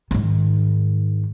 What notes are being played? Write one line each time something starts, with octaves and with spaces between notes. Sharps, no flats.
G#2 D#3